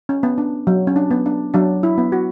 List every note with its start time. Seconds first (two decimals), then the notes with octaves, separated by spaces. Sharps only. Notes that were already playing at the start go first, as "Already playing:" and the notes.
0.09 C#4
0.23 B3
0.38 D4
0.67 F#3
0.87 C#4
0.96 D4
1.11 B3
1.26 D4
1.54 F#3 D4
1.83 E4
1.98 B3
2.12 F#4